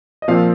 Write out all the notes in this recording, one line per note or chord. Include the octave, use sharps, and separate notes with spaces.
D#5
A#2 F3 C4 F5